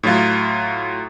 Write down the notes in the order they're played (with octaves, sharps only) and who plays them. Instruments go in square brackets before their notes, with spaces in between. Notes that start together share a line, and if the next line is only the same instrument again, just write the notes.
[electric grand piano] A2 F#3 F4